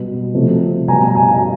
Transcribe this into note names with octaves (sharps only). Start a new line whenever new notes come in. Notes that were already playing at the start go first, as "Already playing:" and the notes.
Already playing: B2 G3 B3
C3 F3 A3
B2 G3 B3 G#5 A#5
G#5 A#5